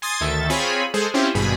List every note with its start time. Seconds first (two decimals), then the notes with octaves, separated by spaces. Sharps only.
0.02 G#5 C6 D#6 G#6 A6
0.21 D2 D#3 A4 E5 A6
0.50 C4 F4 G#4 C#5 G#5 B5
0.94 G#3 G#4 A4 C5
1.14 C4 C#4 E4 F4 G4 C5
1.34 G#1 G2 B2 G#4 B5